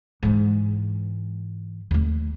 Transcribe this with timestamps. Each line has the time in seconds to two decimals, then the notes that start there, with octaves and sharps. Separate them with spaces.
0.23 G#2 E3
1.91 D#2 A3